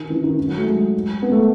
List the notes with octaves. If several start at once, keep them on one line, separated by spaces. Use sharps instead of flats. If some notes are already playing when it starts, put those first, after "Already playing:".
Already playing: D#3
E3
D#3
D#3
F#3
A3
G#3
B3
A3